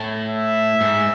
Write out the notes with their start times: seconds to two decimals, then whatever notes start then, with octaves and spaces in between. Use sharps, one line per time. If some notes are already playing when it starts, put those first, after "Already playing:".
Already playing: A2
0.28 E5
0.81 G#2